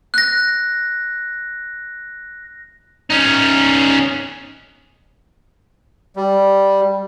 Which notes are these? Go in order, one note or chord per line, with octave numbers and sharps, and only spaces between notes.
F#6 A#6
C#4 D#4
G3